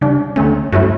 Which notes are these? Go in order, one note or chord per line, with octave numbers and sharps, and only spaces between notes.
C#3 G3 D4
D2 D3 A3 C#4
G2 F#3 A3 C#4 E4